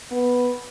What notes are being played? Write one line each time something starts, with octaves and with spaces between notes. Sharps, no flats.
B3